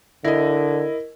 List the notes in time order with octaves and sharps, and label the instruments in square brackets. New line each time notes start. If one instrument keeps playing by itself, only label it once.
[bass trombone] D3 [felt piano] E4 D#5 [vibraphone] A#4